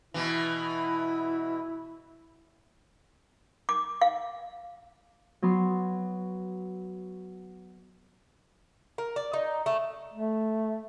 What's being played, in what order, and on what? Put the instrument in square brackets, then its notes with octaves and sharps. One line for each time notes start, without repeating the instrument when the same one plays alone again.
[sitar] B2 E3 [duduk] E4
[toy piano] D6
F5
[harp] F#3 B3 C6
[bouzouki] A#4
D5
D#4
A3
[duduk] A3